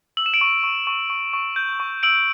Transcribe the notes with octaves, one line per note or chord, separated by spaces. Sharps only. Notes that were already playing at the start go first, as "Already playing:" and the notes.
E6 F#7
E7
D7 F#7
C#6
C#6
C#6
C#6
C#6
G6
C#6
E6 D7 F#7